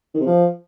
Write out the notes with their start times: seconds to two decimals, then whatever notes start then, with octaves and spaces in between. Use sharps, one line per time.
0.14 D#3
0.20 C3
0.26 F3